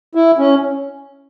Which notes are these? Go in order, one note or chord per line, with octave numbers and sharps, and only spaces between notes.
E4
C#4